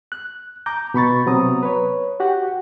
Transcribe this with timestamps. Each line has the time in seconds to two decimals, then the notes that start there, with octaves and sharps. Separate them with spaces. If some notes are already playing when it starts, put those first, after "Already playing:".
0.12 F#6
0.66 A#5 D6 G6
0.94 B2 B5 C#6 A6
1.26 C3 F#3 B3 C4 A#5 D#6
1.63 B4 C#5
2.20 F#4 G4 F#5